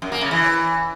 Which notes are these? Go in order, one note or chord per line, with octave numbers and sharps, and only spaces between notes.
F#2
A#3
C#3
E3